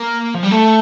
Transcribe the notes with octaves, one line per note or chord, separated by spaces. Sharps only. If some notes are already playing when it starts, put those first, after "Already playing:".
Already playing: A#3
F3
G3
A3